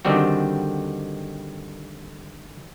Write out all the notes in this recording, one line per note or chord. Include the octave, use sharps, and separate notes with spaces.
D3 D#3 G3 C4 F#4